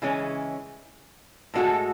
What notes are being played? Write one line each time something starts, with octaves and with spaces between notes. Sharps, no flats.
C#3 E3 G#3 C#4
A2 G#3 B3 F#4 A4